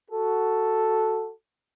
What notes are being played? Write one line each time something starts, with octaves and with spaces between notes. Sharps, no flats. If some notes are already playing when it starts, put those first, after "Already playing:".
F#4 A4